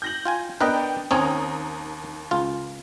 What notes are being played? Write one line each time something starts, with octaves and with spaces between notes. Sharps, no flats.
G6 A#6 F#7
F4 G5 G#5
B3 D4 A#4 B4 D#5 G5
D#2 C4 C#4 C#5 A#5 D#6
C#2 F4